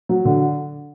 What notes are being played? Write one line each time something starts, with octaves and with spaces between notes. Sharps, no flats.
F#3
D3